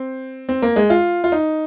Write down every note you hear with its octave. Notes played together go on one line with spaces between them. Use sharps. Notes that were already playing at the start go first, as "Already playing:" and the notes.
Already playing: C4
C4
A#3
G#3
F4
F4
D#4